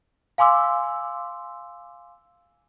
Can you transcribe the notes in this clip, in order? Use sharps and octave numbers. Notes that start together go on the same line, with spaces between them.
F5 G#5 C6 D6 E6